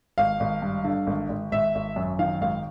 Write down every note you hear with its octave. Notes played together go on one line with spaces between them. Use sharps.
G#1 F5
G#1
G2
D3
G#1
G#1
G#1 E5
G#1
F#2
D#3 F5
G#1 F5